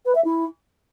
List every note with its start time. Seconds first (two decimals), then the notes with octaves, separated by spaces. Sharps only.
0.05 B4
0.15 E5
0.24 E4